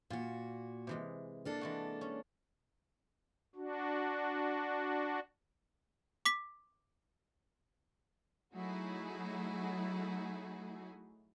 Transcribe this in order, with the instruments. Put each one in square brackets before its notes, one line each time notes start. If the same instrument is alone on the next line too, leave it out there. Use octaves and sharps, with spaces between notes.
[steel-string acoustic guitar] A#2 F#4 [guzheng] F4
[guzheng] C3 E3 G#3
[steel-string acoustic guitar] A#3 D4 A4
[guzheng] E3 G#3 F#4
C#4
[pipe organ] D4 F#4
[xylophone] D6 B6
[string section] F#3 A3 D#4 E4 F#4 G#4